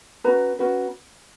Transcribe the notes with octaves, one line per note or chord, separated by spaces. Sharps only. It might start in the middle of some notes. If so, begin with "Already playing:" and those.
C#4 F#4 B4 A#5
C#4 F#4 B4